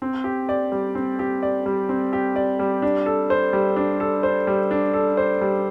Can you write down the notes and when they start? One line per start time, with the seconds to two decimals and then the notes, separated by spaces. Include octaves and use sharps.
0.02 C4
0.24 G4
0.49 D5
0.72 G3
0.95 C4
1.19 G4
1.42 D5
1.66 G3
1.89 C4
2.13 G4
2.36 D5
2.59 G3
2.82 D4
3.06 A4
3.30 C5
3.53 G3
3.76 D4
4.00 A4
4.23 C5
4.47 G3
4.71 D4
4.94 A4
5.17 C5
5.41 G3